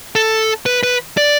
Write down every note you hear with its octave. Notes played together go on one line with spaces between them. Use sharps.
A4
B4
B4
D5